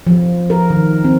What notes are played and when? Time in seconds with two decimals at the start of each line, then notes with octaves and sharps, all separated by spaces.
0.07 F3
0.50 A#4
0.70 D#3
1.04 C4